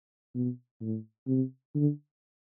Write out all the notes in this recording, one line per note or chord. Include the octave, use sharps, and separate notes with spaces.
B2
A2
C3
D3